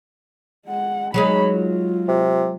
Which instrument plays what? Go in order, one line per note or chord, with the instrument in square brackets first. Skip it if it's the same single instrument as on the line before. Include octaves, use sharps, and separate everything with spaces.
[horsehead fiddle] G#3 F#5
[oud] F#3 G#3 D#4 [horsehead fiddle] C#5 B5
[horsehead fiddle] F4
[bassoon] C3